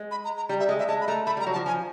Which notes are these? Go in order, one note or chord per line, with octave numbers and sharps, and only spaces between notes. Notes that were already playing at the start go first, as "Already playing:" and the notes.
Already playing: G#3
B5
A#5
A#5
G3 A#5
E5
G#3 D#5
E5
G#3 A5
B5
A3 A#5
A3 B5
G3
A#5
F#3
A5
F3
F3 G#5